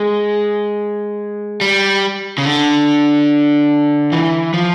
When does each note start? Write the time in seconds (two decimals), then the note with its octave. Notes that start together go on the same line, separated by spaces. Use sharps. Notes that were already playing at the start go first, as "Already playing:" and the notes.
Already playing: G#3
1.61 G3
2.38 C#3
2.45 D3
4.12 E3
4.54 F3